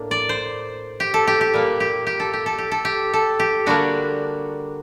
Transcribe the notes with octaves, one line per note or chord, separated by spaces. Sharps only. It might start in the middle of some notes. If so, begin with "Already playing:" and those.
Already playing: A2 A#3 D4
D5
C5
G4
A4
G4
G4
A#2 G3 A#3
G4
G4
A4
G4
A4
G4
A4
G4
A4
G4
D3 G3 A#3 D4 F#4